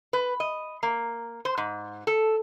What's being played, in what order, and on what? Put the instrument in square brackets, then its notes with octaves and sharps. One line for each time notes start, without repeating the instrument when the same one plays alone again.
[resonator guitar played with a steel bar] B4
D#5
A#3
C5
G#2
A4